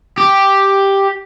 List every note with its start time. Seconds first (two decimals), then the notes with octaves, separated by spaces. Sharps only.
0.18 G4